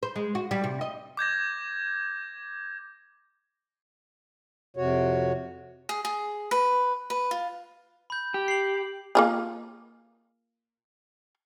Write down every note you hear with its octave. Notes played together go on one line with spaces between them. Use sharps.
C5
G#3
F#4
G3
C3
D#5
D6 G6 G#6 A#6
F2 C3 F#4 C#5
G#4
G#4
B4
B4
F4
B5 G6
G4
C7 F#7
A#3 F4 G#4